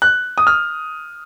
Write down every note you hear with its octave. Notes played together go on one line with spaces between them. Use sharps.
F#6
D#6
F6